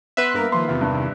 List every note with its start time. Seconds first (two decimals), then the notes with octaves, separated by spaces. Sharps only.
0.17 B3 B4 E5 C6 F#6
0.34 G2 A#3 A#4
0.52 D#3 F3 A#3 C6
0.68 E2 C3 D#3 F4
0.81 G2